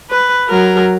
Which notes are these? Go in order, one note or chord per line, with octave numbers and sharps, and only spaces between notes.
B4
F#3 A#4